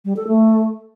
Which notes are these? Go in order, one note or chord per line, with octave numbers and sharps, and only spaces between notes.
G3
A4
A3